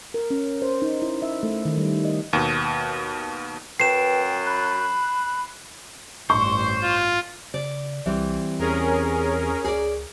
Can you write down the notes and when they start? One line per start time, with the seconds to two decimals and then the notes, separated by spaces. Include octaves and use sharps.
0.14 A#4
0.30 C#4
0.62 C5
0.82 D#4
1.02 E4
1.22 E5
1.43 A3
1.65 D#3
1.78 G3
2.05 D#5
2.33 D#2 B2
3.80 F#2 B4 G5 C7 E7
4.46 B5 F#6
6.30 A1 G2 C5 C#6
6.83 F4
7.54 C#3 D5
8.06 B1 E3 G3 C4
8.59 E2 C#4 G#4 A#4
9.64 C#2 G#4 D5